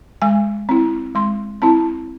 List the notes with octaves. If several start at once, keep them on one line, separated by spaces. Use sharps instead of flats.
G#3 G#5
C4 E4
G#3 C6
C4 E4 A5